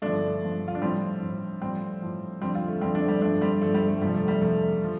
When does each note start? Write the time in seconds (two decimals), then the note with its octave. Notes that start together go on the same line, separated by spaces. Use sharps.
0.02 G2 D3 F3 A3 D4
0.42 G2 D3 F3
0.68 F4
0.75 D4
0.82 A2 F3 G3 C4
1.22 A2 F3
1.61 A2 F3 G3 C4
2.02 A2 F3
2.41 F2 D3 F3 G3 C4
2.54 C4 F4
2.68 A3
2.81 F2 D3 F3 G3 C4
2.95 A3 D4
3.08 G3
3.21 G2 D3 F3 A3 D4
3.41 G3 C4
3.61 G2 D3 F3 A3
3.74 G3
3.88 A3
4.01 F2 C3 F3 G3
4.14 A3
4.28 G3
4.41 F2 C3 F3 A3
4.84 F3